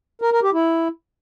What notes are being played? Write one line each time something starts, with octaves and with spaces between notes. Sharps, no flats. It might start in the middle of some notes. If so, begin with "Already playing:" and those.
A#4
A#4
G4
E4